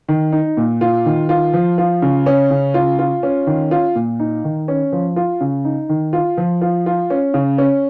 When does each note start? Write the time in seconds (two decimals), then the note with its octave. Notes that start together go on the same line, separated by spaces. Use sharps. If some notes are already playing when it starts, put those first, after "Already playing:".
0.08 D#3
0.32 D#4
0.57 A#2
0.81 F4
1.06 D#3
1.29 F4
1.54 F3
1.78 F4
2.02 C#3
2.26 C#4
2.50 C#3
2.74 F4
2.99 F4
3.23 C#4
3.47 D#3
3.71 F4
3.96 A#2
4.20 D#4
4.44 D#3
4.68 C#4
4.92 F3
5.16 F4
5.41 C#3
5.65 D#4
5.89 D#3
6.13 F4
6.37 F3
6.61 F4
6.86 F4
7.10 C#4
7.34 C#3
7.58 C#4